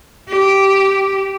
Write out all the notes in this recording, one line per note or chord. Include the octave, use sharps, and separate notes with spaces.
G4